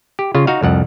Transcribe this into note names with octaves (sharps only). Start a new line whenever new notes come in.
G4
C#3 F4
D#4 F#4 F5
C2 F2 F#5